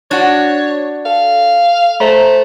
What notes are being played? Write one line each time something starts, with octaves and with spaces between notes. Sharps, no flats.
D4 F#4 C#5
A4 F5
A3 C5 A#5